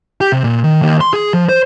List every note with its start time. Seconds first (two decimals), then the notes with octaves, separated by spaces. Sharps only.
0.21 G4
0.32 C3
0.44 A#2
0.64 D#3
0.82 D#2
1.01 C6
1.13 G#4
1.34 F3
1.49 C5